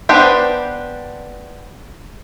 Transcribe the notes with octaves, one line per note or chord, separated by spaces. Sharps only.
B3 D4 G4 B4 C5